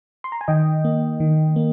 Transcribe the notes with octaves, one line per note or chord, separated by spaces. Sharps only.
C6
A#5
G#5
D#3 D#5 G5
A#3
D#3
A#3